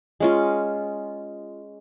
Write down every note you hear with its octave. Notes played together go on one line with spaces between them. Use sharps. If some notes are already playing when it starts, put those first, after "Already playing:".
G#3 C#4 F4